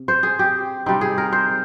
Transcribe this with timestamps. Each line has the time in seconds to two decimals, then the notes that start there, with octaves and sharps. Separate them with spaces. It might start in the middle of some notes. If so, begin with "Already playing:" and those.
Already playing: C3
0.08 C5
0.23 G#4
0.39 G4
0.86 C3 G3 C4 D#4
1.01 G#4
1.18 A#4
1.32 C5